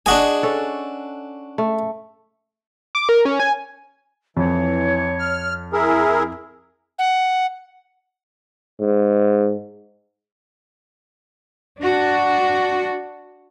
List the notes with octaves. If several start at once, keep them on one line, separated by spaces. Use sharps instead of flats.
D4 F#4 G#4 D5 D#5 G#5
C#4 A4
A3
D6
A#4
C#4
G#5
F2 E3 C#5
F6
E4 G#4 A#4 E5
F#5
G#2
D4 F#4